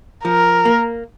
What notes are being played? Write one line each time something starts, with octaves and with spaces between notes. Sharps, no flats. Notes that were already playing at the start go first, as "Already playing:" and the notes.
F3 A#4
A#3